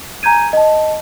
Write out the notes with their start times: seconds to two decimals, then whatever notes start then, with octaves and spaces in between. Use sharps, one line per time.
0.23 G#5 A#5 G6 G#6 D#7
0.53 D#5 A5